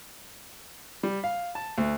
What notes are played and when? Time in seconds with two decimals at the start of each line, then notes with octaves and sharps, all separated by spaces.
1.03 G3
1.24 F5
1.55 A5
1.78 D2